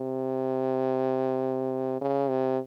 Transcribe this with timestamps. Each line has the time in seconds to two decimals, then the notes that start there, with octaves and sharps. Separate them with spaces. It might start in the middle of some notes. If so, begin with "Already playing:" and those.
Already playing: C3
2.01 C#3
2.29 C3